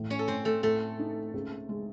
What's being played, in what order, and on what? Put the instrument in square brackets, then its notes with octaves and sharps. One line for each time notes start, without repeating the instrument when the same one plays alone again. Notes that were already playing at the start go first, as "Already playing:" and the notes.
Already playing: [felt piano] A2 E3
[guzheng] C#4 C#5
A4
[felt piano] A2 [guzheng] C4 C5
[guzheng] A3 A4
[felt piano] A2 [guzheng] A3 A4
[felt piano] D#4
C#2
G#3